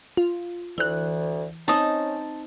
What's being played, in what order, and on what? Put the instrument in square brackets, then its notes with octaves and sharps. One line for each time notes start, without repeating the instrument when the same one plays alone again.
[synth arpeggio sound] F4
[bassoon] D2 [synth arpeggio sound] E3 F#6
[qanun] C4 D#4 [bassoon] C#4 [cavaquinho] A5 D#6